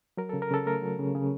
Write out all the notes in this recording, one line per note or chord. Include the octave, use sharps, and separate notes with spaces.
F#3 A#4
C#3 A4
A#4
C#3 A4
A3 A#4
F#3
C#3
C#3